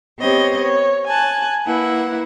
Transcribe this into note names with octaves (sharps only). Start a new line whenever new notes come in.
B3 C4 G4 C#5 D#5
C#5
G#5 A5 F#6
A#3 E4 B4 F#5